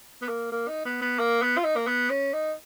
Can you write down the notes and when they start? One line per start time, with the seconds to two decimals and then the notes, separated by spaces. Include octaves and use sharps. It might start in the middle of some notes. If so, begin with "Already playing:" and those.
0.22 B3
0.29 A#3
0.52 A#3
0.68 D#4
0.85 B3
1.02 B3
1.19 A#3
1.42 B3
1.57 F4
1.64 D#4
1.76 A#3
1.87 B3
2.10 C#4
2.33 D#4